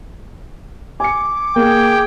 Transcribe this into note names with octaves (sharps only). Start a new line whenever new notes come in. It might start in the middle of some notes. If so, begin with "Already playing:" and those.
G#5 D6 C#7
A#3 G#4 G5